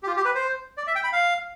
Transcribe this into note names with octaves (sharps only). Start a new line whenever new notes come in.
G4
F4
G4
B4
C5
D5
E5
G5
B5
F5